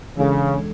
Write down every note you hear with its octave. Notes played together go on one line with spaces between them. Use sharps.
C#3 E3 G#3 D4 A4
G#3